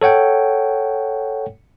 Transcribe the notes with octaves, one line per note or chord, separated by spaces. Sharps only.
A4 C#5 F#5 G5